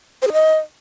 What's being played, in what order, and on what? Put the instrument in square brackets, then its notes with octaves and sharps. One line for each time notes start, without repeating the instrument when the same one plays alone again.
[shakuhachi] C5
G#4
D#5